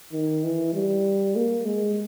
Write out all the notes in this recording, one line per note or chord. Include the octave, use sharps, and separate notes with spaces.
D#3
E3
G3
A#3
G#3